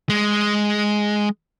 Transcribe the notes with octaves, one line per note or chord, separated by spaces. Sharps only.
G#3